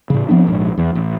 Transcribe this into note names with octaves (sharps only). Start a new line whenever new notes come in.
A2 C#3
F3 B3 C4 D4
A#1 G#2
E2
A1